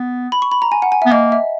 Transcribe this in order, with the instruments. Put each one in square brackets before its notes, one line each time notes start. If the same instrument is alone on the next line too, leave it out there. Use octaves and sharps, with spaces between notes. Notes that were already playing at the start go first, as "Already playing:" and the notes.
Already playing: [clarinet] B3
[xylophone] B5
C#6
B5
A#5
G#5
F#5
G#5
[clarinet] B3 [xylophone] E5
[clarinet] A#3 [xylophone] D#5
[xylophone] E5